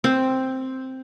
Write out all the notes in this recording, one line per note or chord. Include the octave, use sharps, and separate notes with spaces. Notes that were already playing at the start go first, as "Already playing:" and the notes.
C4